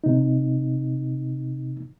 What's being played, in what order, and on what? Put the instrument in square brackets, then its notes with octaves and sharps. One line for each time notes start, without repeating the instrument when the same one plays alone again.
[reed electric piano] C3 D#4